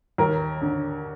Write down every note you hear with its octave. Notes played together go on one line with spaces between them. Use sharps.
D#2 A#4
D3